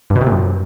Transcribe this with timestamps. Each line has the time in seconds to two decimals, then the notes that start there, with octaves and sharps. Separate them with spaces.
0.10 G2
0.16 B2
0.21 C3
0.26 A#2
0.32 F#2